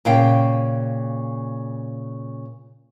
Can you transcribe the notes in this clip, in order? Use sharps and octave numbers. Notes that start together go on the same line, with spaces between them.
A#2 C#3 F5 G5